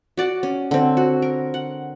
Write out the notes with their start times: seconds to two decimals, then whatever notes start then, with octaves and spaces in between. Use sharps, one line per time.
0.17 F#4 D5 F#5
0.43 C#4
0.71 D3 C4
0.97 F#4
1.22 A#4
1.54 F#5